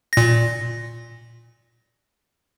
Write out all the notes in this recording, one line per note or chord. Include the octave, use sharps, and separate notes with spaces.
A#2 A#6